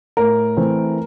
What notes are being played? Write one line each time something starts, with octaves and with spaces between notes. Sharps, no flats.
A2 A#4
E3 A3 C4